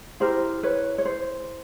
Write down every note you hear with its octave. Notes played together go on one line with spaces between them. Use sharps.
E4 G4 A#4 C5
B4 C#5
C#5
C5